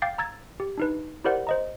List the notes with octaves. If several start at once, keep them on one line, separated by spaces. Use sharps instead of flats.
F5 G5 D6 G6 A6 C7
A#5 E6 G#6 A6
G4
D4 D#4 B4
E4 G4 A#4 C5 D5 F#5
C5 D#5 A#5